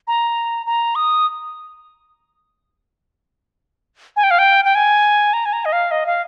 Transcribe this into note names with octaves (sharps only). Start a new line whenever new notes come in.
A#5
A#5
D#6
G#5
G5
F5
G5
G5
G#5
A#5
G#5
A#5
D#5
F5
D#5
F5